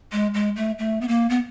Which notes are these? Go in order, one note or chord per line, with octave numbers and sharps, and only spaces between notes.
G#3
G#3
A3
A3
B3
A#3
B3